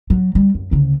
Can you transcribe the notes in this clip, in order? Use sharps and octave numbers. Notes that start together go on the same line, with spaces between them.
F#3
G3
F#2
D2 C#3